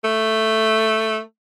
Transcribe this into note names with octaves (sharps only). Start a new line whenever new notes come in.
A3